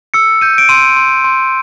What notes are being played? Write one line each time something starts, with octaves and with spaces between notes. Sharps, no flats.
E6 C#7
G6 D#7
D7
C6 D#7
C6
C6